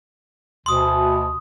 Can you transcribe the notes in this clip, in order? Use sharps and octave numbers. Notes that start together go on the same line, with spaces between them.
D2 B2 C6 D#6